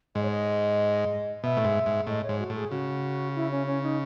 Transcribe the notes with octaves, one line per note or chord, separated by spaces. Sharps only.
G#2 D#5
C#5
D#5
B2 E5
A2
G#2
G#2
A2 D#5
C#5
G#2
F#4
A2
G#4
C#3 F#4
E4
C#4
C#4
D#4